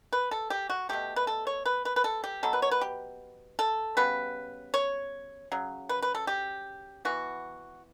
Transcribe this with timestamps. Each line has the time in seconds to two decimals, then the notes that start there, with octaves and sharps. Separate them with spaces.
0.13 B4
0.31 A4
0.50 G4
0.70 F#4
0.89 B2 A3 G4
1.16 B4
1.27 A4
1.47 C#5
1.66 B4
1.85 B4
1.96 B4
2.04 A4
2.24 G4
2.43 B2 F#3 B3 A4
2.53 B4
2.62 C#5
2.71 B4
2.81 G4
3.59 A4
3.97 C#3 G3 B3 B4
4.74 C#5
5.52 C#3 F#3
5.89 B4
6.02 B4
6.15 A4
6.27 G4
7.05 E3 B3 F#4